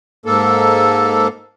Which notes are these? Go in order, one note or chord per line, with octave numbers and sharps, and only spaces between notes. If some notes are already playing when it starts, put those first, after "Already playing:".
G#2 A#3 A4